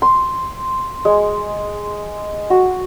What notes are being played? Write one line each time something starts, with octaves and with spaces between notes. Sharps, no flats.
C6
G#3
F#4